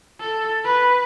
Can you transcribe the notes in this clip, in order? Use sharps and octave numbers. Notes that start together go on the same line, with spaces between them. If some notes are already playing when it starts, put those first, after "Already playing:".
A4
B4